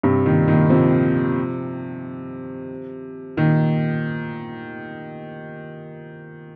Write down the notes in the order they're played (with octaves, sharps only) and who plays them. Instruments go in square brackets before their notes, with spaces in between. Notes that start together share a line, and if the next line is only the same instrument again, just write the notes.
[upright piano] G2 C3
A#2 D#3
A#2 D#3
C3 F3
A#2 D#3